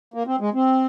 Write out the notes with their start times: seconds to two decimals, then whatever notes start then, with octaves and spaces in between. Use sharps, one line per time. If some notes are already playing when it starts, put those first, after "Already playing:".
0.14 A#3
0.27 C4
0.40 G#3
0.54 C4